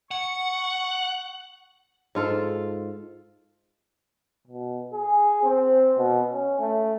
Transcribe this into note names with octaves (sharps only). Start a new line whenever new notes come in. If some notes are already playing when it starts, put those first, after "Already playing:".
F#5 C#6
G#2 F4 A4
B2
G#4
C4
B2
C#4
A3